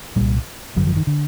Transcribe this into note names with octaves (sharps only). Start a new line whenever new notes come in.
C2 A#2 G3
G#1 F#2 D3 F#3
F3
D#3
D3